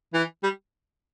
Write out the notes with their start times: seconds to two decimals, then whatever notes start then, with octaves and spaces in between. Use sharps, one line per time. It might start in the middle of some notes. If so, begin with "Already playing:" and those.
0.14 E3
0.43 G3